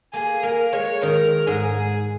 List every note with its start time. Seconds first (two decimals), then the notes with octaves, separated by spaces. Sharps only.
0.14 A#3 G#4
0.43 A#3 A#4
0.73 G#3 C#5
1.02 D#3 A#4
1.47 G#2 G#4